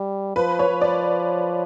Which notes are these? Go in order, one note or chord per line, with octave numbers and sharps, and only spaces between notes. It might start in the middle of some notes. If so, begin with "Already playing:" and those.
Already playing: G3
F3 B4
C#5
F3
D5